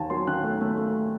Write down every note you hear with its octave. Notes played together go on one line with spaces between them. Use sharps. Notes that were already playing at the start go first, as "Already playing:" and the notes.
Already playing: D#2 D#3 G#5 A5
F#3 C6
D#3 F#6
A3
A3
A3